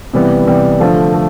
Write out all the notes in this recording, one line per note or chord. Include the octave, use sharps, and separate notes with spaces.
C3 E3 G3 B3
C3 E3 G3 B3
D3 F3 A3
A3